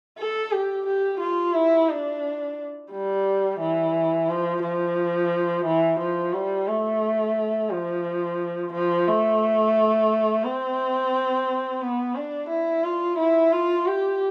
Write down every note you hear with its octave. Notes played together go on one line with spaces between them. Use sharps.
A4
G4
G4
F4
E4
D4
G3
E3
F3
F3
E3
F3
G3
A3
F3
F3
A3
C4
B3
D4
E4
F4
E4
F4
G4